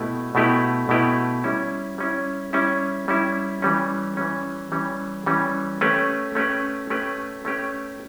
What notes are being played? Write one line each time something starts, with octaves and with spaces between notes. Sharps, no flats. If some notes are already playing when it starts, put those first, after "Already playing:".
Already playing: B2 A3 E4 G4 B4
B2 A3 E4 G4 B4
B2 A3 E4 G4 B4
G3 C#4 E4
G3 C#4 E4
G3 C#4 E4
G3 C#4 E4
E3 G3 C#4
E3 G3 C#4
E3 G3 C#4
E3 G3 C#4
A3 C#4 G4 B4
A3 C#4 G4 B4
A3 C#4 G4 B4
A3 C#4 G4 B4